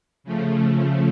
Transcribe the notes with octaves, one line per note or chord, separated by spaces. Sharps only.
C#3 F3 A3